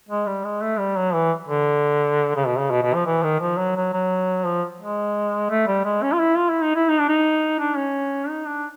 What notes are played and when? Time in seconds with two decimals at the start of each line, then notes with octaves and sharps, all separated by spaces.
0.09 G#3
0.26 G3
0.44 G#3
0.62 A3
0.79 G3
0.97 F#3
1.14 E3
1.48 D3
2.36 C#3
2.47 B2
2.59 C#3
2.71 B2
2.82 B2
2.95 F3
3.06 E3
3.24 D#3
3.40 F3
3.58 F#3
3.76 F#3
3.93 F#3
4.45 F3
4.81 G#3
5.50 A3
5.67 G3
5.85 G#3
6.03 C#4
6.12 F4
6.20 E4
6.37 F4
6.50 E4
6.63 D#4
6.76 E4
6.89 D#4
6.99 D4
7.09 D#4
7.60 D4
7.76 C#4
8.29 D#4
8.47 D4